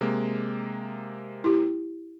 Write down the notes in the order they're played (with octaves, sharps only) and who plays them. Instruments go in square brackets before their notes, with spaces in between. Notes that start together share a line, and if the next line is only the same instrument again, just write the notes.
[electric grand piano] C3 G#3 A#3
[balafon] E4 G4